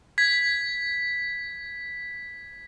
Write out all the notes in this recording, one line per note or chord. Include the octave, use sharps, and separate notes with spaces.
G#6 B6